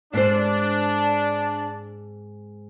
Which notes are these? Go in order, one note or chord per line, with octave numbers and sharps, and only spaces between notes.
G#2 C4 D4 C5